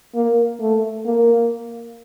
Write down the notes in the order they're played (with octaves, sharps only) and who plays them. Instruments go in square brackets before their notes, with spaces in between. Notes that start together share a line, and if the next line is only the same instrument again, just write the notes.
[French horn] A#3
A3
A#3